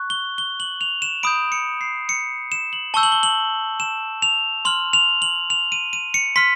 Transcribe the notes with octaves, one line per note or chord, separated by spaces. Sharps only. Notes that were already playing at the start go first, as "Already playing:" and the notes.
Already playing: C#6 F#6
G7
G7
F#7
F7
E7
B5 D#6 G6 D7
C#7
C7
C#7
E7
F#7
A5 C#6 E6 G6 G7
F#7
G7
F#7
E7
F7
C6 F6 F#7
F7
F#7
F7
D#7
D#7
C#7
C6 F6 B6